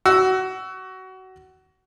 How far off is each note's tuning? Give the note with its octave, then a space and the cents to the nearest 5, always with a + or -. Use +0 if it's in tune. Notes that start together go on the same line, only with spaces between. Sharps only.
F#4 +25 E6 +0